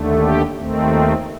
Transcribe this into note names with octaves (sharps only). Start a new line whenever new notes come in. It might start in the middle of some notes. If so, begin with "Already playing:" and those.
Already playing: D#2 D3 A3
G4
D#2 D#3 A3 C4
F4